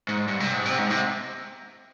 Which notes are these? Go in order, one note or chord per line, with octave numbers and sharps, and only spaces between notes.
G#2
G2
C3
G#2
C3
G#2
C3